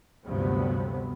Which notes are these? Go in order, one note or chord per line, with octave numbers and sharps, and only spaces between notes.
D2 G2 C3 F3 F#3 B3